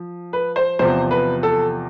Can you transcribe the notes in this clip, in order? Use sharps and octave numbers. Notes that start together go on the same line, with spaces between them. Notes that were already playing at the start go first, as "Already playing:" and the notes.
Already playing: F3
B4
C5
E2 C3 F3 C5
B4
A4